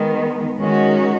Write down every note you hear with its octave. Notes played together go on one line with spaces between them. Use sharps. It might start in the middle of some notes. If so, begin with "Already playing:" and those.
Already playing: D#3 G#3 B3
D#3 G#3 C#4 F#4